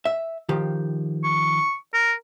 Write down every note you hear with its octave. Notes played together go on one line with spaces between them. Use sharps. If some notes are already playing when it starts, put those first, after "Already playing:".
E5
D#3 F3 G4
C#6
A#4